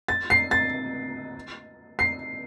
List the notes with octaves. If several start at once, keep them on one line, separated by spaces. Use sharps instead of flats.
A6
C7
A6
C7